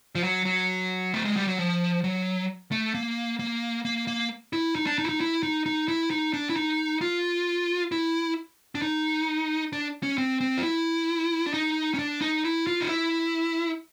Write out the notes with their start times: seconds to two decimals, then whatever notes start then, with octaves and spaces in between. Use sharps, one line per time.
0.15 F3
0.23 F#3
0.45 F#3
1.14 A3
1.25 G#3
1.36 G3
1.48 F#3
1.58 F3
2.04 F#3
2.72 A3
2.94 A#3
3.39 A#3
3.85 A#3
4.07 A#3
4.53 E4
4.75 D#4
4.87 D4
4.98 D#4
5.05 E4
5.09 D#4
5.20 E4
5.43 D#4
5.66 D#4
5.88 E4
6.10 D#4
6.33 D4
6.50 E4
6.56 D#4
7.01 F4
7.92 E4
8.75 D4
8.82 D#4
9.73 D4
10.03 C#4
10.18 C4
10.41 C4
10.58 F4
10.63 E4
11.46 D4
11.54 D#4
11.94 C#4
11.99 D4
12.21 D#4
12.44 E4
12.67 F4
12.80 D#4
12.89 E4